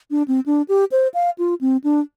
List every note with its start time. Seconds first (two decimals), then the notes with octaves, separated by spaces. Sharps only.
0.11 D4
0.28 C4
0.46 D4
0.69 G4
0.92 C5
1.14 F5
1.38 F4
1.61 C4
1.84 D4